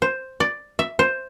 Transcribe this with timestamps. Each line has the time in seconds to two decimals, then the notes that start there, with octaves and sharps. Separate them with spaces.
0.02 C5
0.40 D5
0.79 E5
0.99 C5